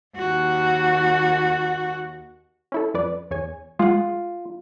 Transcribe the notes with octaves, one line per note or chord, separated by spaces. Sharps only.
D#2 F#4
C#4 E4 A4
F2 B4 D5
E2 C#5 G#5
G#3 F4 F#5